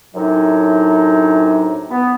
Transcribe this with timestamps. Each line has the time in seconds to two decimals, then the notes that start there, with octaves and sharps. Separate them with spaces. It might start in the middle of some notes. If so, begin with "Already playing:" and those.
0.15 F#2 A2 C3 F#3 D4 D#4
1.90 B3